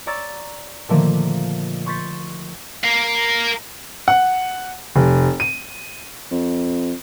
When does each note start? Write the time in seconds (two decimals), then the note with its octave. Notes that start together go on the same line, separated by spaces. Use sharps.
0.06 C#5 D5 A#5 C#6 E6 A6
0.89 A#2 D3 D#3 F3 A3 A#3
1.86 C6 C#6 G6 A6 B6 C7
2.84 A#4 F5
4.08 F#5
4.96 F1
5.40 D#7
6.31 F2